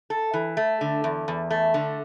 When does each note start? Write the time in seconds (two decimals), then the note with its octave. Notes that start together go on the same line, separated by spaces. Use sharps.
0.10 A4
0.34 E3
0.57 A3
0.81 D3
1.04 E2
1.28 E2
1.50 A3
1.74 D3